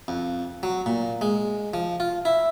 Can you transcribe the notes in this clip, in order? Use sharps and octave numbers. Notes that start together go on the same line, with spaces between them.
F2
F#3
A#2
G#3
F3
F4
E4